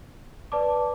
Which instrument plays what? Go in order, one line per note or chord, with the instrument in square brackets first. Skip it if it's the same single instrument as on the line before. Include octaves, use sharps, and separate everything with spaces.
[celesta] B4 D5 A5 D6